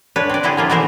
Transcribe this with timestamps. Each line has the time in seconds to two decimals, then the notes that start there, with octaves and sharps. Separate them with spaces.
0.16 D4 B4 C#5
0.29 C4 D5
0.43 D3 E4 G4 G#4
0.57 F3 A#3 F4
0.70 B2 E3 A3 A#4 C5